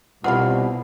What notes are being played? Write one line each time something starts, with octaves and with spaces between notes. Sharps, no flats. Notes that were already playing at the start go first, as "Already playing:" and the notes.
C2 B2 F4 B4 D5 F5 F#5 B5